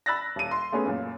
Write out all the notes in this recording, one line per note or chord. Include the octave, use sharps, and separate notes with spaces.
B5 E6 F#6 A6 A#6
D#1 D#7
C6
A3 B3 C#4 G#4
F#2 A#2